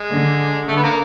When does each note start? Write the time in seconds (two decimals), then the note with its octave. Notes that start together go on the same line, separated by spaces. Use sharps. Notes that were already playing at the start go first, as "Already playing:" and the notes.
Already playing: G#3
0.09 D3
0.68 D3 A3
0.77 B3
0.84 A#3